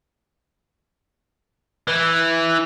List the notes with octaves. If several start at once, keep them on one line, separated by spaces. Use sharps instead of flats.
E3